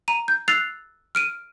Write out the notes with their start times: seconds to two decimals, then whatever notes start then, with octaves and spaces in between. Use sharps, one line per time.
0.08 A#5 D#7
0.28 G6
0.48 E6 F#6 A6 C7 F7
1.15 F6 D7 D#7